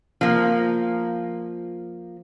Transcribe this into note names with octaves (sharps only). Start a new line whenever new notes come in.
F3 A#3